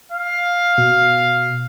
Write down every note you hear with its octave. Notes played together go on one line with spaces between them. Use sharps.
F5
B2